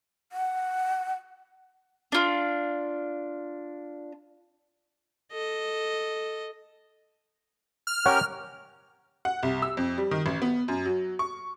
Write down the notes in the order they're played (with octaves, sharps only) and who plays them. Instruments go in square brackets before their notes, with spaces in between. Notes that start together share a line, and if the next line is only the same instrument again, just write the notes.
[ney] F#5
[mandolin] D4 F4
[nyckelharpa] A4 D#5
[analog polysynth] F6
[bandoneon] C#4 G4 A#4 [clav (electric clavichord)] C#5 F#5
[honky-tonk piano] F#5
C2
E6
F2
G3
D#3
A1
B3
F#2
F#3
C#6